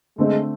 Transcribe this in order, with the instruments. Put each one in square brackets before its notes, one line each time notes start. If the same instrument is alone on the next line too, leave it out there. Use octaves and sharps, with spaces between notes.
[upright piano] D3 A3 C4 [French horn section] G#3